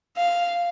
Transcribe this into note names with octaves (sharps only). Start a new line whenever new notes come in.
F5